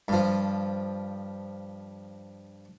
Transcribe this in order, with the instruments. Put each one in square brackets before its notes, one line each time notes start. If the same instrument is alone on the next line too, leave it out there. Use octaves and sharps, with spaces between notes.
[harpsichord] G2 F3